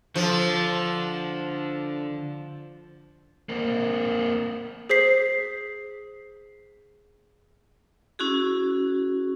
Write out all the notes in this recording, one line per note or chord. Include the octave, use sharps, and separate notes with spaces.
D3 F3
A#3 C4
G#4 C5 B6 C7
C#4 E4 F#4 G#4